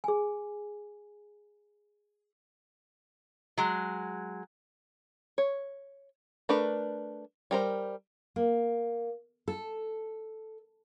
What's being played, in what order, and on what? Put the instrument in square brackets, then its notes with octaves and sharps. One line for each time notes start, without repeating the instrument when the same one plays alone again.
[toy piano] G#4 G#5
[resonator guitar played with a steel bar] F#3 G#3
[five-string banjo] C#5
A3 D4 A#4 B4
G3 A#4 C5
[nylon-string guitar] A#3
A4